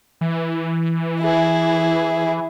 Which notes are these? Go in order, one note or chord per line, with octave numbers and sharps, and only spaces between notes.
E3
E4 G#4